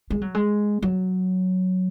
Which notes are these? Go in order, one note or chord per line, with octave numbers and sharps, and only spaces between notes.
G#3
F#3
G#3
F#3